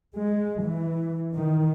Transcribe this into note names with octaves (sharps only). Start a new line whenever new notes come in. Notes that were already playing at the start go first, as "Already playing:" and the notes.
G#3
E3
D#3